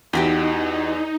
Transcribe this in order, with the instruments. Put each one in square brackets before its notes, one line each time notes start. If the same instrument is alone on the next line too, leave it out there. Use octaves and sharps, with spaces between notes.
[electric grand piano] E2 [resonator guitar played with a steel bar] E3 F#4 G4 [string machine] D#4